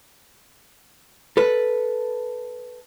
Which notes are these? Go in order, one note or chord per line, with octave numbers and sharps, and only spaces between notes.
A4 B4